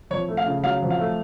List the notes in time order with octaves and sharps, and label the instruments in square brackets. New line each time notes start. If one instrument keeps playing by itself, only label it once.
[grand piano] F2 C#5
A3
F5
C#3
F#3 F5
F2
F5
A3